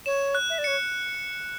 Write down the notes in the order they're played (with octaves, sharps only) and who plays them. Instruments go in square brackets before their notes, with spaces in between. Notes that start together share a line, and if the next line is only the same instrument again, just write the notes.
[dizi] C#5 [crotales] E7
[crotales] F#6
[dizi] E5
D5
[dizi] C#5 [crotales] C#7